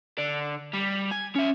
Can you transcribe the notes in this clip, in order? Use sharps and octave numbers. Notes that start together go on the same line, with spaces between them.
D3 D5
G3
G#5
C#4 E5